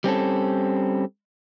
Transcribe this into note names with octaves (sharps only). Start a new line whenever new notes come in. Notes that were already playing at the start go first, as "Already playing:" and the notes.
G3 C4 C#4 A4